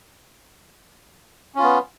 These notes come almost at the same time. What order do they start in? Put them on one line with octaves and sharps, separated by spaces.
C#4 F4 B3